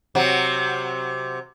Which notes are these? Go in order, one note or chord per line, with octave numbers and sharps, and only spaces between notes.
C3 F#3